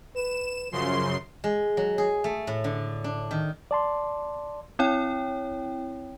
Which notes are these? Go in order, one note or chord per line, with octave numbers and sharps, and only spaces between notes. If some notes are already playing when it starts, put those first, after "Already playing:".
B4 E7
F#2 C#3 F3 C6
G#3
F#3
G#4
A3
A2
D3
D4
D#3
D5 A5 C6
C4 E4 C#5 G5